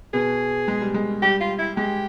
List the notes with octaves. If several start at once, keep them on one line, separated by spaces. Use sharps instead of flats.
B2 B3 G#4
G#3
G3
G#3
G3 G4
F4
E4
G#3 G4